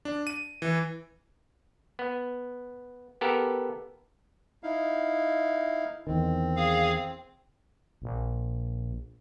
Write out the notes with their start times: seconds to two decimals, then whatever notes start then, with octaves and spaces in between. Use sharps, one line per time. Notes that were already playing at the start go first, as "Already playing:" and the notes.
0.05 D4
0.27 D#7
0.62 E3
1.99 B3
3.21 B3 G4 A4 A#4
4.63 D#4 E4 F5
6.07 E2 D#3 C4
6.56 G#4 F5
8.02 A#1